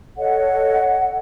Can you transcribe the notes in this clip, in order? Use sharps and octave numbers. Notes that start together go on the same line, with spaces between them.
A4 C#5 D#5 F#5